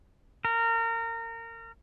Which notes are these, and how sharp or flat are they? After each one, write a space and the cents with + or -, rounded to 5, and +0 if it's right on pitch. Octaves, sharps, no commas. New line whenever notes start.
A#4 -25